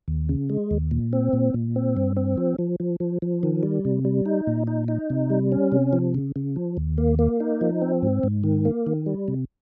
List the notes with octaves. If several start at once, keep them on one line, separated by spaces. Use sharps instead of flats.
D#2
C#3
G#3
D#2
A#2
C4
A#2
A#2
C4
G2
C4
F3
F3
F3
F3
F3
D#3
G3
C3
G3
D#4
A#2
D#4
D#4
C3
G3
C#4
C3
F3
C#3
C#3
F3
D#2
A#3
A#3
D#4
F3
C4
G#2
G#2
D#3
A#3
D#3
G3
C3